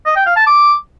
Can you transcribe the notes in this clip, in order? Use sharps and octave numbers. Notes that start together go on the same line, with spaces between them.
D#5
G5
F5
A5
D6